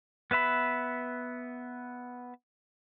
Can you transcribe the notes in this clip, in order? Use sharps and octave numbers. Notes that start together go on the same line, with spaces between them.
B3 B4 E5 B5